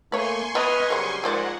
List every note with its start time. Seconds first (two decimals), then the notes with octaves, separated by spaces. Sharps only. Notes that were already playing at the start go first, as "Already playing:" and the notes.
0.12 A3 A#3 B4 C#5 G#5 C6 C#6
0.55 B3 E4 B4 D#5 D#6 F6
0.90 C#3 F#3 G3 A#4 C5 F#5
1.24 G#2 F3 A#3 C5 D5 F#5